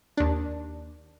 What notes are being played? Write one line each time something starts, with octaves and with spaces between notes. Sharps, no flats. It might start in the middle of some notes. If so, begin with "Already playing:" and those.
D#2 D4